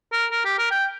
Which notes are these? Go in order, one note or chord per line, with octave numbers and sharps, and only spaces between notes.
A#4
A#4
G4
A#4
G5